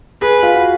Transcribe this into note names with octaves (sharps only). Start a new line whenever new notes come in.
G#4 B4
F4
F#4